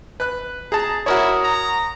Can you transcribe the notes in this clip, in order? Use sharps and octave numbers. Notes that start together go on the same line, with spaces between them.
B4 F#6
G#4 A5 A#5
E4 F#4 A#4 C#5 D#6
A#5